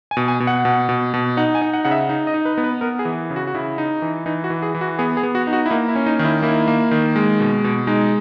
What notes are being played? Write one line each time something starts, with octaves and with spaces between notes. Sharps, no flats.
G#5
B2
G#5
B2
F#5
B2
B2
B2
D#4 F#5
G#5
D#4
F#5
C#3 F#5
E5
D#4
D#5
D#4
B4
B3
B4
B3 A#4
G#4
E3
C#3
F#4
F#4
C#3 E4
D#4
E3
E3 D#4
F#4
E3
G#4
E3
F#4
B3 G#4
G#4
B3
F#4
D#4
F#4
E4
A#3 D#4
E4
C#4
D#4
D#3
E4
A#3 E4
A#3
D#3
G#3
B2
B2
G#3 D#4